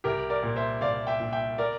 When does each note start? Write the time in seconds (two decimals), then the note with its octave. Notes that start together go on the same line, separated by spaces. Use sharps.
0.04 C2 G4 A#4
0.30 A#4 D5
0.43 A#2
0.56 C5 E5
0.81 C2 D5 F5
1.07 E5 G5
1.19 A#2
1.32 E5 G5
1.58 A#4 D5